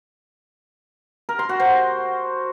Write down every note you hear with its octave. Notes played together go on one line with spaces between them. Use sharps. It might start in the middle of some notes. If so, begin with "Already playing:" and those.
A#4
C6
F#4
C5